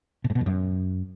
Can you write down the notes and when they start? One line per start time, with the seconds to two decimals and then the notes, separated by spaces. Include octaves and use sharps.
0.24 B2
0.30 G#2
0.35 B2
0.41 F2
0.46 F#2